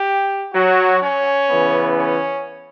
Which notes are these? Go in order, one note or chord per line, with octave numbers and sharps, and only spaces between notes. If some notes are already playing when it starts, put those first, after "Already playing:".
Already playing: G4
F#3 F#4
C#4
C#3 E3 B3
C#4